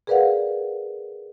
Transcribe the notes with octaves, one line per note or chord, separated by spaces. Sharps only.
G#4 A#4 B4 D5 F5 F#5